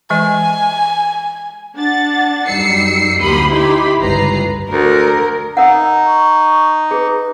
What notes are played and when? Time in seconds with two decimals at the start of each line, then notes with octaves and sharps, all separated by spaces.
0.10 E3 G#3 D#5 G#5
1.76 D4 F#5 A6
2.46 F#2 G3 D#4 E6 C7 C#7
3.21 D2 A#3 G4 B5 C6 D#6
3.51 D#4 E4 G4 B5 C6
4.00 G1 C#2 B4 A#5 C7
4.71 D2 A#4
5.57 D#4 A#4 D#5 F#5
6.07 C#6
6.91 G#4 B4